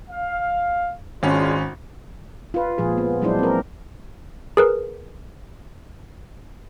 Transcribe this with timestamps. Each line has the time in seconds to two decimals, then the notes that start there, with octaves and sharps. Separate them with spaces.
0.10 F5
1.23 G#1 G#3 C#4 D4 F4
2.54 F4 B4
2.78 A#2 F3 G#3 G#4
2.98 B3
3.21 F3 F#3 G#3 D4 E4 C5
3.39 C4 A#4
4.57 G#4 A#4 B4